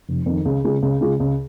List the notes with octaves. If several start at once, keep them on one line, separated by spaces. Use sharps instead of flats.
F1
F2 D#3
C#2
C#3 G#3 F4
C#2
C#3 G#3 F4
C#2